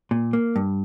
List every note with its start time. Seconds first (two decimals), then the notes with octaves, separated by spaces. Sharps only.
0.11 A#2
0.33 A#3
0.56 G2